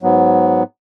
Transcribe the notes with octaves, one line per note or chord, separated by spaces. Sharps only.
G#2 F#3 B3